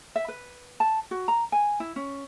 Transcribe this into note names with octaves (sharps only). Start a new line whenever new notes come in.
E5
B4
A5
F#4
A#5
G#5
E4
C#4